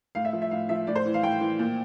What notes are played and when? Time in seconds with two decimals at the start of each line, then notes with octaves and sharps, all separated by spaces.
0.15 A2 F5
0.25 E5
0.33 F3
0.42 E5
0.51 A2 F5
0.69 F3 E5
0.87 A2 D5
0.95 C5
1.06 E3
1.14 F5
1.23 A2 G5
1.41 E3
1.59 A#2